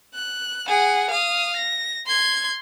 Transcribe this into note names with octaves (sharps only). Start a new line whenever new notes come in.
F#6
G#4 F#5
F5 D#6
A#6
C6 G#6